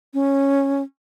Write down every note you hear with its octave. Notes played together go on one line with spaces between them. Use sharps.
C#4